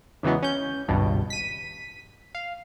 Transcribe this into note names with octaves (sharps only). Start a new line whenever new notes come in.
E2 C#3 E3 F#3 G#3 B3
C#4 G6
G#1 C#2 G2 B2
B6 D#7
F5